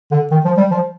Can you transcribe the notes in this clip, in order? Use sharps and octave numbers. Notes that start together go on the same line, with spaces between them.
D3
D#3
F3
G3
F3